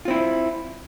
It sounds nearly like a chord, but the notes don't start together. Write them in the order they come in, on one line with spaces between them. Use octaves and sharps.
F4 C4 E4